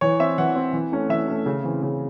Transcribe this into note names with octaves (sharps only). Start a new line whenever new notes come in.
E3 C#5
C4 E5
E3 F#5
C4
E3
A3 C#4
E3 E5
A3 C#4
C#3
E3 C4
C#3